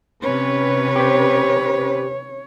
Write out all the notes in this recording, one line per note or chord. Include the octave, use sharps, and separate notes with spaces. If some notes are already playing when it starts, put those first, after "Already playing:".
C3 C#4 B4 C#5
G4 C5